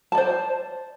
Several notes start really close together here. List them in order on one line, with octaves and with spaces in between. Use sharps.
A5 D5 C5